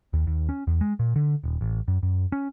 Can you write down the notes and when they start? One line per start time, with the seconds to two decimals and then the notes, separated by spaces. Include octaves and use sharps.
0.13 D#2
0.27 D#2
0.49 C#4
0.67 E2
0.81 G#3
0.99 A#2
1.16 D3
1.44 D#1
1.61 A1
1.88 F#2
2.03 F#2
2.32 C#4